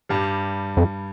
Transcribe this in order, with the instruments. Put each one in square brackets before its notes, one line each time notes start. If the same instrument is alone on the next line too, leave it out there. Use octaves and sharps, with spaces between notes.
[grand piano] G2 G3
[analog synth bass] F2